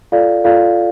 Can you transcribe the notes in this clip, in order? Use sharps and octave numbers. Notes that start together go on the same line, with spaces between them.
F4 A4 D5 F5
F4 A4 D5 F5